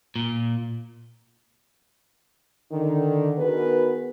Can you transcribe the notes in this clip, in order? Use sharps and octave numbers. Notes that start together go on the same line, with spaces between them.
A#2
D3 D#3
D#3 B3 F#4 G#4 A#4 B4